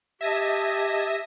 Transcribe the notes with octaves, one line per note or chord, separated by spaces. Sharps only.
G4 D#5 E5 A5 G#6 A#6 D#7